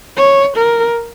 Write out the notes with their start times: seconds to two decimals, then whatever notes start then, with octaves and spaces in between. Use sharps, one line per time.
0.17 C#5
0.57 A#4